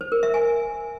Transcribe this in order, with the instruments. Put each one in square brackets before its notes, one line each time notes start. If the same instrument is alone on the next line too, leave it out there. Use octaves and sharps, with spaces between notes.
[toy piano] C5
A#4
E5
G#5